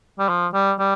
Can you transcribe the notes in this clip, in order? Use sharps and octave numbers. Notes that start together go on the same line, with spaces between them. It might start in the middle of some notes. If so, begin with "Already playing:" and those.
G3
F3
G3
G3